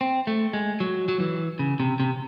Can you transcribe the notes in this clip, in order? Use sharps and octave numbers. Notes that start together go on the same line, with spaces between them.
C4
A3
G#3
F#3
F#3
E3
C#3
C3
C3